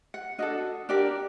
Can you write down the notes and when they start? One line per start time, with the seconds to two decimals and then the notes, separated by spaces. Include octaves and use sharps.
0.14 F#5
0.38 D4 F#4 A4 D#5
0.89 D4 G4 A#4 D5